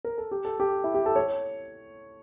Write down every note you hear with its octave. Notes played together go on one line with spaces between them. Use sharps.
A#4
A4
G4
A4
G4
E4
G4
A4
C#5